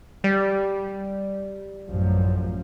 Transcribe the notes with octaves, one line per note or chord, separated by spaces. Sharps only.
G3
A1 F#2 F3